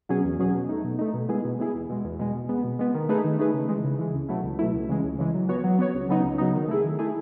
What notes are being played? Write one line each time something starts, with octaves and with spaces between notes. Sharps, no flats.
B2 F#3 C#4 G#4
E2
B2 F#3 C#4 G#4
B2
A3 D#4
B2
A3 D#4
B2
G#3 B3 E4 G#4
B2
G#3 B3 E4 G#4
E2
B2 G#3
E2
B2 G#3
B2
G#3 B3
B2
G#3 B3
D#3
A3 D#4 G#4 B4
D#3
A3 D#4 G#4 B4
C#3
E3 G#3
C#3
E3 G#3
C#2
B2 F#3 A3 E4
C#2
B2 F#3 A3 E4
C#2
C#3 E3 G#3
C#2
C#3 E3 G#3
F#3
B3 F#4 C#5
F#3
B3 F#4 C#5
C#2
C#3 F#3 B3 D#4
C#2
C#3 F#3 B3 D#4
D#3
A3 E4 G#4
D#3
A3 E4 G#4